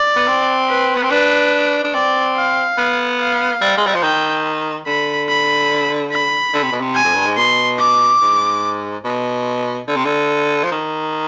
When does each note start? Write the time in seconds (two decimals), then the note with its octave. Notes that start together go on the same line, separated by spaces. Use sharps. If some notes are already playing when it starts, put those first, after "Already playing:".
Already playing: D5
0.16 B3
0.27 C4
0.69 B4
0.95 B3
1.03 C4
1.10 D4 B4
1.84 D4
1.94 C4 D5
2.37 F5
2.78 B3
3.20 F5
3.61 G3
3.77 G#3
3.86 G3
3.95 F3
4.03 D#3 G5
4.87 D3 B5
5.29 B5
6.12 B5
6.54 D3
6.63 C3
6.72 B2
6.81 C3
6.95 G#5
7.04 F2
7.15 G2
7.26 G#2
7.37 B2 C6
7.79 D6
8.21 G#2
9.04 B2
9.88 D3
9.96 C3
10.05 D3
10.64 F3
10.72 D#3